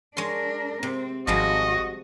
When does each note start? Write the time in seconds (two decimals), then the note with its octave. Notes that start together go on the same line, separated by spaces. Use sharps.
0.17 G#3 D4 A#4 C#5 C6
0.83 C3 C4
1.27 G#1 F3 G3 G#3 F#4 D#5